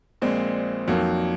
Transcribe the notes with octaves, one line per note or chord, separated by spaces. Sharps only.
A#1 A#2 G#3 C4
F2 D#3 F#3 A#3